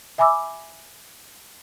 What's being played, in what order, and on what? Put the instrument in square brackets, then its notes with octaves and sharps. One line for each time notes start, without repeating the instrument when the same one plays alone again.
[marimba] E5 G#5 B5 D6 E6